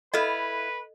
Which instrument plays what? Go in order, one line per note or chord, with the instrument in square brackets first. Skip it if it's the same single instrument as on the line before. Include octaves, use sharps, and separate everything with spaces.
[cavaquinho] E4 F5 [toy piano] A4 D#5 [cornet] B4